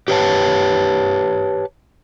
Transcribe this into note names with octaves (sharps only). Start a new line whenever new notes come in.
G4 B4 C#5 A5